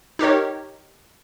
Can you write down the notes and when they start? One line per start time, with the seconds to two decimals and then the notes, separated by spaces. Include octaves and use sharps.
0.19 D#4 G4 A#4 C#5